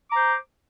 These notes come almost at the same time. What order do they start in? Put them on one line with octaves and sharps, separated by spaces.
D6 A#5 C5